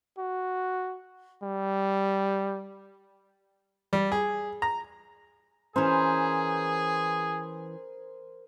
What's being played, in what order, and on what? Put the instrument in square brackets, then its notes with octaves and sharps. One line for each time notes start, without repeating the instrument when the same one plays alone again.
[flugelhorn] F#4
G3
[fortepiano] G3
G#4
A#5
[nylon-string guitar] E3 C#4 [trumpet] G#4 [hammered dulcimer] A#4 C5